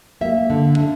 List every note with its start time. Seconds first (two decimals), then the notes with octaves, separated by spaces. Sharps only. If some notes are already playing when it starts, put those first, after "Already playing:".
0.21 A#3 E5
0.50 D3
0.78 D4